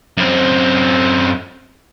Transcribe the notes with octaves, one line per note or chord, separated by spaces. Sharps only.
F#2 C4